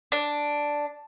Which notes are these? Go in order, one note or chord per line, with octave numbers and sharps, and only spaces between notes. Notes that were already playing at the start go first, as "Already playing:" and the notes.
D4